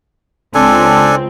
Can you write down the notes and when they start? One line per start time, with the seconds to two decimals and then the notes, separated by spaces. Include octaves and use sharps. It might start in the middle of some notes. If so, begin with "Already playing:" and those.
0.55 C#2 C4 D4 A4 G#5